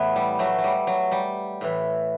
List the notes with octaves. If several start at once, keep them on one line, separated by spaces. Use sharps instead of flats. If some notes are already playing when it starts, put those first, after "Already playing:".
Already playing: A2 E3 A3 B3
G3
F#3 A3
F#3
G3
F#3
G3
A2 E3